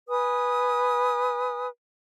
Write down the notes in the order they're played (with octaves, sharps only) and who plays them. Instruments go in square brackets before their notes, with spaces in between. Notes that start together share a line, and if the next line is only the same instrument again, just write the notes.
[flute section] B4 G#5 D#6